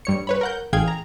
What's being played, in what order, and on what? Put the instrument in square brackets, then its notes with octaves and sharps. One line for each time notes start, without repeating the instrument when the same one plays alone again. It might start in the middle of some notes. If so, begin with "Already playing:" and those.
[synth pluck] G2 C#5 C#7
B4 C#5 B5
A#4 F#5 G6
A1 G#4 F5 G5 G#6
A#5